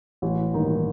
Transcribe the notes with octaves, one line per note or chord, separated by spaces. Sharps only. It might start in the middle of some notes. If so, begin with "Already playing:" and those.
A1
G2 D#3 A#3 D#4